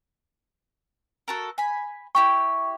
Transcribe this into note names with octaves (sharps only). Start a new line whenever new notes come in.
F#4 A4 A#4
G#5 B5
E4 G4 G5 C#6